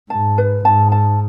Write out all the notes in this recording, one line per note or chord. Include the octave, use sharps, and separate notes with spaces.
G#2 A5
B4
G#2 A5
A5